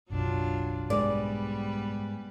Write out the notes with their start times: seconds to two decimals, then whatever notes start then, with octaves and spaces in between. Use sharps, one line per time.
0.10 F#1 B1 F#2 F#3 D4 F4
0.90 G#2 G3 G#3 B3 B4 D5